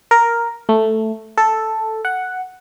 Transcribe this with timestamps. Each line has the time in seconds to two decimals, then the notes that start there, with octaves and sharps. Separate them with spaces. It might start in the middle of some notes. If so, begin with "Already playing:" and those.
0.11 A#4
0.69 A3
1.37 A4
2.05 F#5